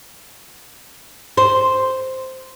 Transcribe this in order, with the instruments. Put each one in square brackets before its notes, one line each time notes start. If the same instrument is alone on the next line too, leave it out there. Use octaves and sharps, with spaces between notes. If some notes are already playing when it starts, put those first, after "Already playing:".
[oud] C5